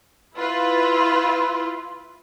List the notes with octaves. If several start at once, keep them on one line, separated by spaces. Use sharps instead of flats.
E4 F4 B4